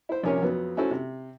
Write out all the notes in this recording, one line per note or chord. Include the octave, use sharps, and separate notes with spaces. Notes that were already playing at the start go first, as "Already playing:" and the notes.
E4 C5
A#1 C3 C#4 A#4 C#5
F2 F#3 B3
C#4 E4 F#4 A4 C5
C3